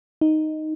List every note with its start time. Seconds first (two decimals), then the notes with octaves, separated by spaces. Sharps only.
0.21 D#4